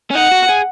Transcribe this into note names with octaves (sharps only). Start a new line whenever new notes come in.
C#4
D#4 F#5
F#4
G#4